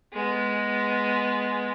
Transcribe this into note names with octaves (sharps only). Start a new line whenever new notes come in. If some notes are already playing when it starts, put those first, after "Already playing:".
G#3 B3